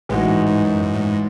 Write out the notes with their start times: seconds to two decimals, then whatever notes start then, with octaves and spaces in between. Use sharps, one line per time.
0.09 A1 A2 E3 G#3 D#4 F#4
0.28 G#2
0.47 G#2
0.65 F#2
0.83 G#2
0.94 A2
1.01 G#2